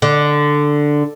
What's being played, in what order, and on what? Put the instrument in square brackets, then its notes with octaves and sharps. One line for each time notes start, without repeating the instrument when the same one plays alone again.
[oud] D3